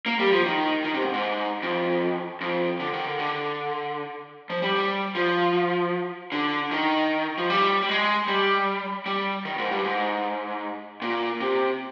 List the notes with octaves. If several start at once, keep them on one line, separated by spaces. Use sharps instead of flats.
A#3
G3
F3
D#3
D#3
C3
G#2
G#2
F2
F2
D3
D#3
D3
D3
F3
G3
G3
F3
D3
D#3
F3
G3
G3
G#3
G3
G3
D#3
G#2
G2
G#2
A#2
C3